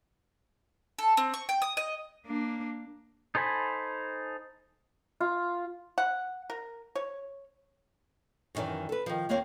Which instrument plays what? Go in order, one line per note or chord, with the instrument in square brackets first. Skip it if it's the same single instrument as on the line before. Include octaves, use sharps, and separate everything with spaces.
[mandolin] A4
C4
C#6
G5
D#6
D#5
[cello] A#3 D4
[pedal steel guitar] D#4 A4 C5 G#5 B5
[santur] F4
[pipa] F#5
A#4
C#5
[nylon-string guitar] F#2 A2 D#3 E3 D5
A4 B4
D#3 F3
D#2 A#3 C4 C#5 F5